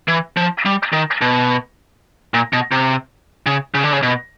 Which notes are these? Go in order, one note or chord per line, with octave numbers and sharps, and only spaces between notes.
E3
F3
G3
D#3
B2
A#2
B2
C3
C#3
C#3
D3
C#3
B2